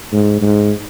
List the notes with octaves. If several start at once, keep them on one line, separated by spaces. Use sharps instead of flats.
G#2
G#2